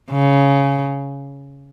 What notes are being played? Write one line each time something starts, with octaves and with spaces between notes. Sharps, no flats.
C#3